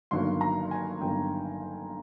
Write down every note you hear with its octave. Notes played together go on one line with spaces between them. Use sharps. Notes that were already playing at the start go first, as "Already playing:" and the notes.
G1 G2 D#3 F#3 A#3 C6
A#5
G#5
G1 G2 D#3 F#3 A#3 G5